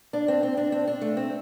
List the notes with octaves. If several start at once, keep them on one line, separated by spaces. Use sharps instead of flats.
D4
C4
C4
D4
C4
D4
A3
C4